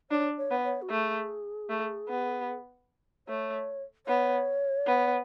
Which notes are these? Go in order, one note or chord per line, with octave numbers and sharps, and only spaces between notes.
D4 C#5
C#5
B3
C#5
F#4
A3 G#4
A3
B3
A3 C#5
B3 C#5
B3